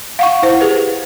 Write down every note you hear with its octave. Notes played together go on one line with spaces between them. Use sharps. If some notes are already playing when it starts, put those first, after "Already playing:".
F5 F#5 C#6
E4 C5 F#5
G4 G#4 B4